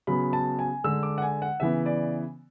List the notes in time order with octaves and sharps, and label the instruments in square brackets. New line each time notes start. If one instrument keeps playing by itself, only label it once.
[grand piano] C#3 F#3 B3 B5
A5
G#5
D3 G#3 D4 E6
D6
F#5
G#5
F#5
C#3 E3 B3 E5
D5